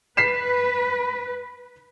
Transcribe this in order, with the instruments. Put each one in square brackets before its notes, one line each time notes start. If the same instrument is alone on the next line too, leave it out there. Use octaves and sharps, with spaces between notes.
[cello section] B4 [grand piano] B6 C7 E7